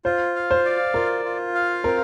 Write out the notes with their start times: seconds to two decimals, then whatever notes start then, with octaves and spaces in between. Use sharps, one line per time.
0.05 F4 C5
0.36 F5
0.51 C5
0.65 D5
0.94 F4 A#4
1.25 F4
1.55 F5
1.84 C4 A#4